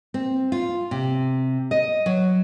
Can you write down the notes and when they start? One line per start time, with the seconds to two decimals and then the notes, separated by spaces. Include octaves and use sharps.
0.14 C4
0.52 F4
0.91 C3
1.71 D#5
2.06 F#3